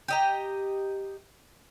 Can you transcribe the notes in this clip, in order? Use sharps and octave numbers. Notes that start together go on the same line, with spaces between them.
G4 D#5 A#5